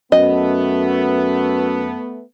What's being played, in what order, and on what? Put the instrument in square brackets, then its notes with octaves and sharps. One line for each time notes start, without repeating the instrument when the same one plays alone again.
[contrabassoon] F#2 [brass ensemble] A3 B3 [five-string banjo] D#5